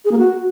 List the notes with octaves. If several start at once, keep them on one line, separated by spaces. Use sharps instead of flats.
G#4
A#3
F#4